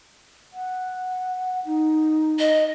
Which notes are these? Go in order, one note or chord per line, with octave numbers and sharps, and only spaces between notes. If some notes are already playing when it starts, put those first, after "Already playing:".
F#5
D#4
D#5